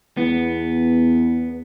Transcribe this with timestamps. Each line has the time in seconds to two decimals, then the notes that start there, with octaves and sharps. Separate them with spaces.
0.17 E2 B3